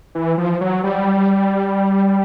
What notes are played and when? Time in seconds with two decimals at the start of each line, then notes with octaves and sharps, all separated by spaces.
0.15 E3
0.38 F3
0.61 F#3
0.84 G3